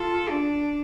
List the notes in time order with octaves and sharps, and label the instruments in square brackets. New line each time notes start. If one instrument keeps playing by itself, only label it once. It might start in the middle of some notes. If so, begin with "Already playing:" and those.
Already playing: [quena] F4 [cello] A4
[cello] D4